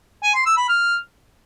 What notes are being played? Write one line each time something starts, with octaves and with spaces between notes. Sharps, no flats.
G#5
C6
E6
B5
F6